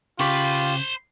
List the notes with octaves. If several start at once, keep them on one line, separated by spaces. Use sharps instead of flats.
C#3 F4 G4 C5 B5 C#6